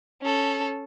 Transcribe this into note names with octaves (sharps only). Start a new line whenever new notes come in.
C#4 A4